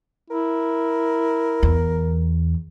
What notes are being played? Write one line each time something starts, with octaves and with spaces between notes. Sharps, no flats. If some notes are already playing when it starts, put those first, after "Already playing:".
E4 A#4
E2